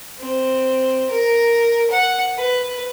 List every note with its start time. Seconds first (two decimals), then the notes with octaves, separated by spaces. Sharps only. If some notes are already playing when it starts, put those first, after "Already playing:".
0.19 C4
1.10 A#4
1.91 F#5
2.37 B4